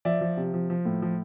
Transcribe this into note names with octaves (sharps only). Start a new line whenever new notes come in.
F3 D5 E5
F3
C3
F3
F3
A2
F3